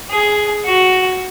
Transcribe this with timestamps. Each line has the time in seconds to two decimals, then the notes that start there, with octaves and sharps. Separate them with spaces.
0.10 G#4
0.65 F#4